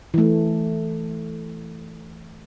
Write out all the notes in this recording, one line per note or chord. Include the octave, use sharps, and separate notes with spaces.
E3 A3